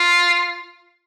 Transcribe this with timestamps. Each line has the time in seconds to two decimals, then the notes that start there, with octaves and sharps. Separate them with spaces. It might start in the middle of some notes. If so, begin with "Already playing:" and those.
Already playing: F4